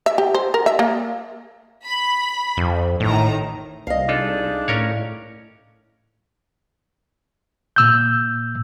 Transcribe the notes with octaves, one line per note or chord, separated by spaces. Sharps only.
E5
G4
C5
A#4
E5
A#3
B5
F2
A1 A2 D#3 A#5
C2 D#5 F5
G#3 D4 D#4 F4 A4
A2 C#4 A#4 C#5
A#2 E6 G6